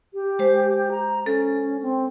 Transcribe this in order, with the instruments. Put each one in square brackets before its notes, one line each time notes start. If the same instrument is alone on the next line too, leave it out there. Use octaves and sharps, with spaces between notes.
[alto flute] G4
[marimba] G#3 C5
[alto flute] A#5
[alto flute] C#4 [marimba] A4
[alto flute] C4